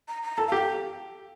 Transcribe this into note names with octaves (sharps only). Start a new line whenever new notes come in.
A#5
A#5
A4 A5
G4 F5
G5